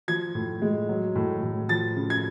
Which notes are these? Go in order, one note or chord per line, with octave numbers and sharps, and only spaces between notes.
F3 G#6
A2
G#3
F#3
A2
A2
F3 A6
C#3
G#6